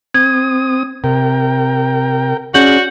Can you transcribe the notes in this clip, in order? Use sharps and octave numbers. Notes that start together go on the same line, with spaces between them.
C4 D#6 G#6
C3 A#4 G5
C#4 F#4 G#4 D5 G6 F#7